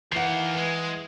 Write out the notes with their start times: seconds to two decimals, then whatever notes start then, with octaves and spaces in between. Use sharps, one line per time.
0.12 D#3 E3 A#3 F#5 C7
0.58 G#3